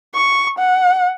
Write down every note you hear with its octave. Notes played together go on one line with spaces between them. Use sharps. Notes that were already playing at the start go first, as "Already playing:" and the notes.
C#6
F#5